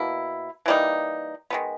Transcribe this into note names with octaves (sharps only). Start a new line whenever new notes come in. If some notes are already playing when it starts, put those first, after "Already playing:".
Already playing: B2 A#3 E4
E3 G3 A#3 D#4
D#3 G#3 B3